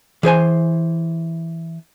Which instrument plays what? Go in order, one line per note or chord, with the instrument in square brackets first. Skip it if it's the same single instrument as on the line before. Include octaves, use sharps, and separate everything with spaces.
[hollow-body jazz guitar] E3 G#4 C5 G#5